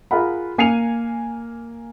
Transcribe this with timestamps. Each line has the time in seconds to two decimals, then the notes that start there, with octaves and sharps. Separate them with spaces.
0.11 F4 G#4 A#4 F#5 B5
0.58 A#3 G#5 C7 C#7 D#7 F7